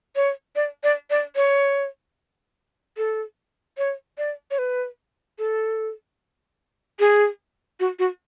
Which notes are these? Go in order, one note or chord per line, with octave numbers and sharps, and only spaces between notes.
C#5
D5
D5
D5
C#5
A4
C#5
D5
C#5
B4
A4
G#4
F#4
F#4